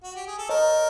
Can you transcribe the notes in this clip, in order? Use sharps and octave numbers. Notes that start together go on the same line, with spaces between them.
F#4
G4
G#4
A4
A#4 C#5 D#5